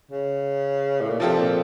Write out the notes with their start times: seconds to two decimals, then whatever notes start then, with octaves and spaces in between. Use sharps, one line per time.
0.11 C#3
1.01 A2
1.10 A#2
1.19 C3 F3 C4 F4 A4
1.38 A#2